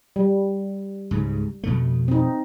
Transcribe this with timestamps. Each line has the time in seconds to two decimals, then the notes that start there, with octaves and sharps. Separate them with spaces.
0.16 G3
1.11 C#2 G#2 C#3
1.64 F2 B2 A3
2.08 C4 D#4